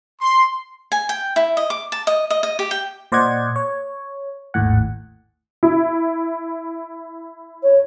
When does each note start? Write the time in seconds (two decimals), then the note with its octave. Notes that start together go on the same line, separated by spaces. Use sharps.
0.21 C6
0.92 G#5
1.09 G5
1.36 E4
1.57 D#5
1.70 D6
1.92 A5
2.07 D#5
2.31 D#5
2.43 D#5
2.59 G4
2.71 G5
3.12 A#2 C5 D5 D#5 F#5 G#6
3.56 C#5
4.54 G#1 D#2 A2 F#5
5.63 E4
7.63 C#5